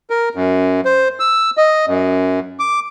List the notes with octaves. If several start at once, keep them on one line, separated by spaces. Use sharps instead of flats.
A#4
F#2
C5
E6
D#5
F#2
D6